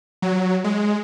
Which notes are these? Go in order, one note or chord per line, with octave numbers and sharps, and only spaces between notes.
F#3
G#3